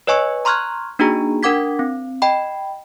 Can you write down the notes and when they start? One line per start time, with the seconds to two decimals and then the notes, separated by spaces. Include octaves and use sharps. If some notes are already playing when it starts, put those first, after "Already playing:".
0.07 B4 C#5 D#5 G#5 C#6 E6
0.45 A#5 C6 C#6 F6 F#6 G#6
0.99 A#3 D4 D#4 F#4 G#4 A#5
1.43 D4 A#4 F#5 D6 G#6 B6
1.79 C4
2.22 D#5 G5 B5